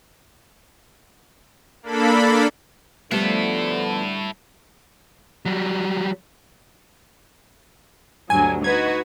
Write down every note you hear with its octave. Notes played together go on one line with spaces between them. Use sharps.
A#3 D4 A4 B5
D3 F3 G3 A3 B3 E4 A4 C7
F#3 G3
D2 G2 F#3 G#5
D#4 F#4 B4 G#6